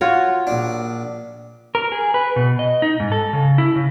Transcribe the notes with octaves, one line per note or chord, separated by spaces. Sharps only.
F4 F#4 C#5
A#1 D4
A#4
G#4
B4
B2
D#5
D#4
G#2
A4
C#3
E4
C#3